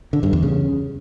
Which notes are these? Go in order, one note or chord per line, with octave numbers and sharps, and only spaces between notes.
D3
G2
E2
C#3